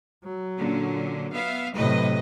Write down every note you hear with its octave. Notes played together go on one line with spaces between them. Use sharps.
F#3
A#2 D3 C#4
B3 E5 F5
A2 C3 F#3 B4 D#5